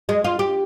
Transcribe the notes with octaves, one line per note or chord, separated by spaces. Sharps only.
G#3
F4
G4